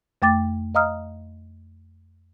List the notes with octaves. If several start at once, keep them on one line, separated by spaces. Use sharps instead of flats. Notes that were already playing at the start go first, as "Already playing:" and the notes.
F2 A3 G5 D6 A6
D#5 F5 A#5 D#6 F6